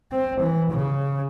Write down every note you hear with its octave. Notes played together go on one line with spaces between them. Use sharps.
C4
E3
C#3